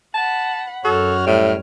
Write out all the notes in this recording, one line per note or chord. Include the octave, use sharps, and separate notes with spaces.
F#5 A5 B5
F#2 F#4 A4 C#5 F6
A2 G3